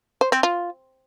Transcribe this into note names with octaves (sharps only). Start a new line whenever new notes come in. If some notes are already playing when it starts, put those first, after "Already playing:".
C5
C4
F4